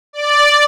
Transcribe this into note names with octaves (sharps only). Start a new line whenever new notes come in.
D5